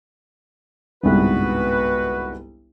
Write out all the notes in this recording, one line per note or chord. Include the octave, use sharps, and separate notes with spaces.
G1 C2 G#2 B3 F#4 B4